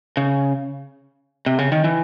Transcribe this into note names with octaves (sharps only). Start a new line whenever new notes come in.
C#3
C3
C#3
D#3
E3